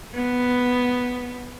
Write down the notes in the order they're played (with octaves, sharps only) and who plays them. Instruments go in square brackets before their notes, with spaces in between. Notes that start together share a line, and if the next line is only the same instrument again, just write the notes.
[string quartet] B3